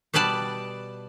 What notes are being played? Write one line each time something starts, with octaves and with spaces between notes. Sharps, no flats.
B2 G3 B4 D5 A5